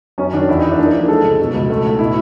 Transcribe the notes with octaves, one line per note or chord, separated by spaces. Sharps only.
F#2 C#4
D#3 D4
E2 E4
E2 D#4
D4
A#3 D#4
F3
G#3 A4
C#2
B2
C#2
A3
A2
B2 E4